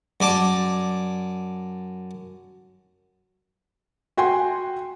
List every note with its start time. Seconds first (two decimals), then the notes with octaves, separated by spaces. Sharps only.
0.20 F#2 D5 A5
4.17 F#4 G5 G#5 C6